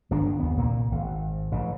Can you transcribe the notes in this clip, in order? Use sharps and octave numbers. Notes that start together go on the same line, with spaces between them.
G1 D#3 G#3 D4
D#2 B3
C2 A#2 A#3
G#1
A1 C#3